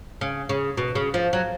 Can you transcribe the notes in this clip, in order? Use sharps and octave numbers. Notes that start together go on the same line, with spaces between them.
C#3
C#3
B2
C#3
F3
F#3